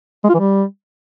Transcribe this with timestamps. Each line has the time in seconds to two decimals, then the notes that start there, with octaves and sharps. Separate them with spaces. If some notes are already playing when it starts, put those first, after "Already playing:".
0.24 G#3
0.29 F4
0.34 E3
0.39 G3